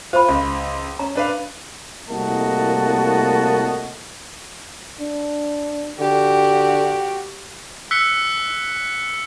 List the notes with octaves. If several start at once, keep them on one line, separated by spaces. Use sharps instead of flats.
F4 C5 B5
C#2
C#4 A#5
D4 B4 F5
C2 A2 A#3 F#4 D#5 A5
D4
D3 F#4 G4
E6 F#6 B6 C#7 G7